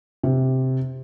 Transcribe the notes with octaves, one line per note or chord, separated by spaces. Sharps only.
C3